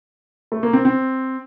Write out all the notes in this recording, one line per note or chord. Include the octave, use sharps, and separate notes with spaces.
A3
A#3
C4
C4